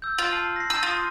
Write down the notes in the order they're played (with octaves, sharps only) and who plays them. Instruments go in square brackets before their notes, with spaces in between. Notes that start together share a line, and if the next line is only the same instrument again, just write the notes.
[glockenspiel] E6 G6
[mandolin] F4 [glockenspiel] C6 F6
[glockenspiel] A5 C7 F#7
A#6 C7
[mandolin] E6 [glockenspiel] G6 D#7
[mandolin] F4 [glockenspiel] C6 D#6